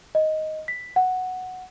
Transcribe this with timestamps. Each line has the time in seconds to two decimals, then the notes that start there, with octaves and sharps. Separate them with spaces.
0.15 D#5
0.68 B6
0.96 F#5